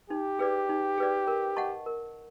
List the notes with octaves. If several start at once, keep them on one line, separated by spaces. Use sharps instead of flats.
D#4 G4
G#4 B4 D5
D#4
G#4 B4 D5
A#4
D#5 F#5 A5 C#6
A#4